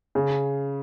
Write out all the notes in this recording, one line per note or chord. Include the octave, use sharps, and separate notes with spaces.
C#3